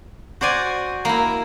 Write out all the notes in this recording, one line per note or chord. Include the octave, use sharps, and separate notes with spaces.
F#4 C5 D5 G#5
A#3 E4